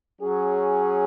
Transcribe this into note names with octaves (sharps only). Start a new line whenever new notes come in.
F#3 C#4 G#4